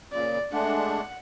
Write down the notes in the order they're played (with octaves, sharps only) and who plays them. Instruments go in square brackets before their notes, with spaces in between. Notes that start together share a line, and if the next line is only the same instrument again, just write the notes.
[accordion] A#2 C#3 [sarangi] D5
[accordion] G#3 A3 D4 [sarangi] F#5